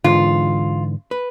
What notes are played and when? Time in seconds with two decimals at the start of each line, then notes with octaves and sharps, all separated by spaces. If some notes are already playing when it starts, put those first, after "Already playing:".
0.04 G#2 D3 E3 F4
1.11 B4